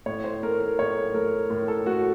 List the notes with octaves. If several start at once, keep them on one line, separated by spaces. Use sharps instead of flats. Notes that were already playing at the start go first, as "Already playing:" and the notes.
A2 C#5
C5
A3 A#4
A#4
A2 C#5
A3 A#4
A2 A#4
A4
A3 F#4